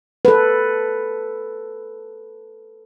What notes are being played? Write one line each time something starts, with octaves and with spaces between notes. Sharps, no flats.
A4 B4